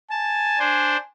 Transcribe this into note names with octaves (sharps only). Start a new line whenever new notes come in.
G#5 A5
D4 C5